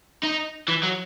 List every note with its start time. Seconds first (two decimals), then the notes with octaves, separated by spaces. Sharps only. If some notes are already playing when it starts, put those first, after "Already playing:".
0.23 D#4
0.68 E3
0.83 F#3